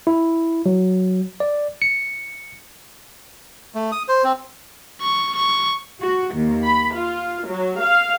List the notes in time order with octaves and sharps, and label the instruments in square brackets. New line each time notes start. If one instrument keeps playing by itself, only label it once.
[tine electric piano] E4
F#3
D5
C#7
[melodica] A3
D#6
C5
C4
[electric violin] C#6
C#6
[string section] F#4
D#2
B5
F4
F#3
F5